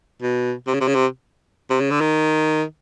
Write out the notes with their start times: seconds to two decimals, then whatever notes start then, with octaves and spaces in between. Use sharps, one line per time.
0.22 B2
0.67 C3
0.74 C#3
0.81 C3
0.88 C#3
0.95 C3
1.71 C3
1.81 C#3
1.91 D3
2.01 D#3